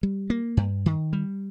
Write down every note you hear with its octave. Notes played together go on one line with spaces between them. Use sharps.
G3
A#3
G2
D#3
G3